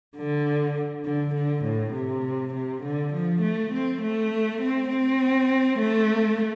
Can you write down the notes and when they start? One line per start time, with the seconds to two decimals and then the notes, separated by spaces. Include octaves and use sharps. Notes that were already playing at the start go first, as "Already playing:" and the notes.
0.17 D3
1.05 D3
1.34 D3
1.64 A2
1.93 C3
2.54 C3
2.83 D3
3.13 F3
3.41 A3
3.72 C4
4.02 A3
4.61 C4
4.89 C4
5.79 A3